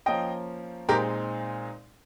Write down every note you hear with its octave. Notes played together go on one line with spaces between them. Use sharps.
F3 A#3 C#4 D#5 G5
A#2 G#3 C4 D#4 G4 A#4